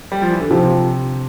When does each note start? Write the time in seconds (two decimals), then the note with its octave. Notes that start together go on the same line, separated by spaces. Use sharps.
0.12 G3
0.22 F3
0.31 E3
0.40 D3
0.50 C3 F3